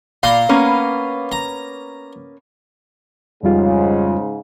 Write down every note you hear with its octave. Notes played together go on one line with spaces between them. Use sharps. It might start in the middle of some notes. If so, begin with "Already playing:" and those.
A#2 F5 A#5 C6
A#3 B3 C#4
A#5
F2 G#2 C#3 G3 F4